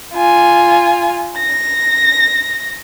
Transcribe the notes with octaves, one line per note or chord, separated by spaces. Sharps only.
F4 G#5
A#6